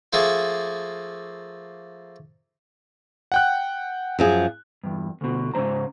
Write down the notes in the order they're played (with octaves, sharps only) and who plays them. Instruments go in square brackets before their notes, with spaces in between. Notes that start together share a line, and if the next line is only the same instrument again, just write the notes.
[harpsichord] F3 A3 A#3 G#4
[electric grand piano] F#5 G5 F#6
[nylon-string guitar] F#2 F3 G#4
[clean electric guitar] E2 G2
D2 B2
G#2 C#3 G#3 C5 A#5